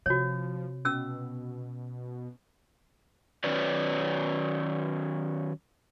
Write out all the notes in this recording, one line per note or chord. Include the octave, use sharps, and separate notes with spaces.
C3 F3 F#4 C#5
B2 C#4 E6
D#3 F#3 C#4 B4 D5